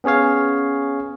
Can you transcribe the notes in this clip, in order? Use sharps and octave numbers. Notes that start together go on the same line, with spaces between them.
B3 C#4 G#4 C#5 F5